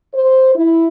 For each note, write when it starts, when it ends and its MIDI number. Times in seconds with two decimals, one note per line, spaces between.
0.14 0.54 72
0.55 0.87 64